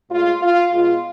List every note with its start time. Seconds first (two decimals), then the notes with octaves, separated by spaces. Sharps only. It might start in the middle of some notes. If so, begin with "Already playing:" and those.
0.10 A2 G#3 F4
0.42 F4
0.72 B2 G#3 F4